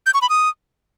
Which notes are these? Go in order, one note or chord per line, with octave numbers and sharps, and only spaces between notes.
G6
C#6
B5
D#6